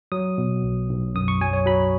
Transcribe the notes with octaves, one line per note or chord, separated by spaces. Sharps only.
F#3 D#6
B2
B1
B1
F#2 D#6
C#6
F#3 G#5
C#5
F#3 B5